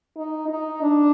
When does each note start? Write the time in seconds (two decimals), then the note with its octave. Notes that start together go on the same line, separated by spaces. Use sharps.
0.17 D#4
0.49 D#4
0.83 D4